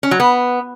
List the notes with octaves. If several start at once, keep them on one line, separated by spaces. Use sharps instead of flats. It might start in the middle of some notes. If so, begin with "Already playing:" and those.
C#4
F#3
B3